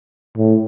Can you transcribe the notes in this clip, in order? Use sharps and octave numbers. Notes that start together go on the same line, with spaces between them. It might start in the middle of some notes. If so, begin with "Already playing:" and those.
A2